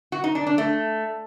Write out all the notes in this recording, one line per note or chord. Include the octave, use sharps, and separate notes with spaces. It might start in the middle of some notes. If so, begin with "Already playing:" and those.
F#4
D#4
D4
D4
A3